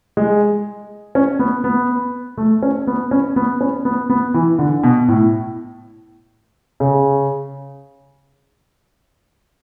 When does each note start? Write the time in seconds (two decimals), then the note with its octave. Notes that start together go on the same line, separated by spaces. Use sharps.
0.17 G#3
1.15 C#4
1.39 B3
1.64 B3
2.38 A3
2.63 C#4
2.87 B3
3.11 C#4
3.36 B3
3.61 C#4
3.85 B3
4.10 B3
4.34 E3
4.59 D3
4.84 B2
5.08 A2
6.80 C#3